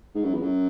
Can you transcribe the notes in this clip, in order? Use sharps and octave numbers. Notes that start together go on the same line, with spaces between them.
G#2
F#2
E2
F#2